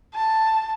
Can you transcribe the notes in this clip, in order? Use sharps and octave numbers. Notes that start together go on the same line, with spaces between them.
A5